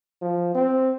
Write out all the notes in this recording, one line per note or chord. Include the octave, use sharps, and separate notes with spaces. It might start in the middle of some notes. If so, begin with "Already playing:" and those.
F3
C4